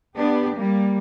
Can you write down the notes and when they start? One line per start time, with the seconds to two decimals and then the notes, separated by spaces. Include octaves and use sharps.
0.17 B3 D4 G4
0.56 G3 A#3